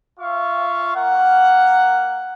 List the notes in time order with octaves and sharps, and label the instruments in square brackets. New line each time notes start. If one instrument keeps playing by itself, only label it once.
[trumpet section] F4 E5 F5 C#6
A#3 A#4 F#5